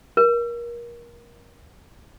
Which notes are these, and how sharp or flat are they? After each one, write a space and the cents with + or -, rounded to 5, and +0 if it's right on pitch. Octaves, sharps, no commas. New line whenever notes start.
A#4 +25